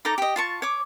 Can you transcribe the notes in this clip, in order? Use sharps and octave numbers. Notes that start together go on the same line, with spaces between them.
D#4 A4 A#5 D6
G4 D#5
F4 A5 C#6
C#5 D6